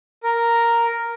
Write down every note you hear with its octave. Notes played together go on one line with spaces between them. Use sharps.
A#4